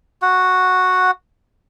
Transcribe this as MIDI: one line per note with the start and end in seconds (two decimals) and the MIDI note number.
0.22 1.11 66
0.22 1.11 78